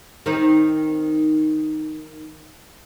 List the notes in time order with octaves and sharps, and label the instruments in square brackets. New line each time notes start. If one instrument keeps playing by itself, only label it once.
[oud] D#3 C4 D#4